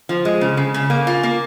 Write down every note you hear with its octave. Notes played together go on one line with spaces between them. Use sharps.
F3
G#3
C#3
C#3
C#3
A#3
F4
A#3